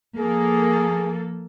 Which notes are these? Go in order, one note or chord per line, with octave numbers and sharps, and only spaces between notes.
F3 A#3 G#4 A4